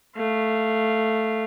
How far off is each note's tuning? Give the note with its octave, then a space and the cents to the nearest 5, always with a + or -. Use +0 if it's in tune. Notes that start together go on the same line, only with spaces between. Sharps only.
A3 +0 F5 -10